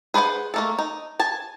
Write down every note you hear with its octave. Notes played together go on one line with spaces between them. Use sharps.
G#4 B4 C5 D5 F#5
A3 A#3 A4
D#4
G#5 A5